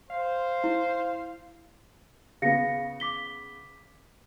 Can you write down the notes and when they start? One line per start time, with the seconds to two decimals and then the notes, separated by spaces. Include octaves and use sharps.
0.10 C5 F5
0.64 E4
2.42 C#3 B3 F5 A#6 C#7
3.00 D6 B6 G7